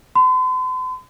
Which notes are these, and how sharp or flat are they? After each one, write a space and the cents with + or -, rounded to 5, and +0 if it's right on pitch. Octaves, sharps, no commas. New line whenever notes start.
C6 -45